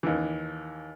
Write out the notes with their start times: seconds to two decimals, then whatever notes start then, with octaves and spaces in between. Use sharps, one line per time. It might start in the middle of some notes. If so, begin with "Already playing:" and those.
0.03 D#2 E3